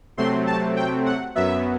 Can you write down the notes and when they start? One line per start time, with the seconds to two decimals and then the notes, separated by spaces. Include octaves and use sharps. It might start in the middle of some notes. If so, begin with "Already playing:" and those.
0.17 C3 F#3 A3 C4 C6
0.47 A5
0.76 G5
1.06 F#5
1.35 F#2 F#3 B3 E5